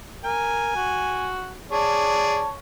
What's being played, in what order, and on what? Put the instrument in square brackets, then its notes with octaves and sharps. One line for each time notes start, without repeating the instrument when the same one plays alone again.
[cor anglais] A#4 [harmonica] G#5
[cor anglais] F#4
[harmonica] G#4 D5 [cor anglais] C#5 [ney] A5